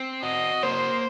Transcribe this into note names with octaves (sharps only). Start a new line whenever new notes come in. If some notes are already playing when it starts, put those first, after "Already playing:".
Already playing: C4
F#4 D#5
A#3 C5